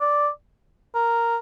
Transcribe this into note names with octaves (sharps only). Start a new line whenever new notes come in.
D5
A#4